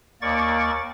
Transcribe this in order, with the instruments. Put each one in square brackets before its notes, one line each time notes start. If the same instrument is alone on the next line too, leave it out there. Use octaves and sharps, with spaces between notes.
[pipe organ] D#2 A#3 D5 C#6 A6